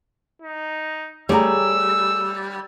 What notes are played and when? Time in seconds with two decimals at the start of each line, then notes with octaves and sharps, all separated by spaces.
0.42 D#4
1.29 G3 A3 G#4 C#5 A#5 E6